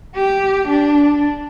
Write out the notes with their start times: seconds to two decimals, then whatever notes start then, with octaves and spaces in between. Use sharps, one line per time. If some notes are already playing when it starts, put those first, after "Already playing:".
0.16 G4
0.68 D4